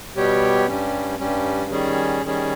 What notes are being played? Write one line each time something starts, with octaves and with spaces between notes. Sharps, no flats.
B2 G3 B3 G4 C#5
G2 G3 C#4
G2 G3 C#4
D#3 G3 C#4 G#4
D#3 G3 C#4 G#4